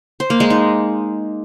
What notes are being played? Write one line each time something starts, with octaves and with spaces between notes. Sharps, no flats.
C5
A#3
G#3
D#4